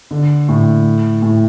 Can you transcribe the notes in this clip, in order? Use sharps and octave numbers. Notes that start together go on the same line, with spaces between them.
D3
A2
A2